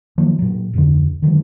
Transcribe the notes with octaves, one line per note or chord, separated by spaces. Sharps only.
D#3 F3 F#3 A#3
A#2 F#3
D1 F2 D3
D3 D#3 F#3 G#3